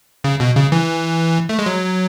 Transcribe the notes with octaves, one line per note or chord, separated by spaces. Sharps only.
C#3
B2
C#3
E3
A3
G#3
F#3